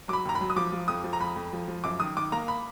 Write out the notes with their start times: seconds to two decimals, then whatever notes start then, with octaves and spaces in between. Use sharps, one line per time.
0.08 F#3 D6
0.13 B5
0.25 D#2 A#5
0.35 B5
0.41 F#3
0.50 D#6
0.56 F3 D6
0.72 F3
0.88 F2 D#6
1.04 F3
1.13 A#5
1.20 F2 B5
1.36 F2
1.53 F3
1.68 F3
1.84 F#2 D6
2.00 D#3 D#6
2.17 D#3 D6
2.32 A#3 A#5
2.48 B5